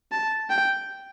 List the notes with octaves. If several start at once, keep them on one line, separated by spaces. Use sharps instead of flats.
A5
G5